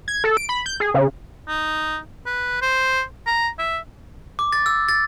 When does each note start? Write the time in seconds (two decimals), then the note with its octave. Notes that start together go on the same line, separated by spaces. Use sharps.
0.08 G#6
0.24 A4
0.37 D7
0.49 B5
0.66 G6
0.80 G#4
0.94 C#3
1.48 D#4
2.26 B4
2.62 C5
3.27 A#5
3.59 E5
4.39 D6
4.52 A6
4.66 E6
4.88 A6